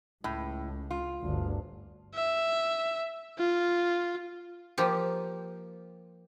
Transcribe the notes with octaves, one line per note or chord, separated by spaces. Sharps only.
C#2 A2
F4
G1 D2
E5
F4
F3 A#3 F4 G4